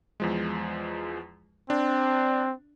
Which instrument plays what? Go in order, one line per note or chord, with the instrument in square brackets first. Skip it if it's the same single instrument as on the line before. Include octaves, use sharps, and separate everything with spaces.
[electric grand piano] E2 F3 G#3
[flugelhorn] C4 [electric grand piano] D4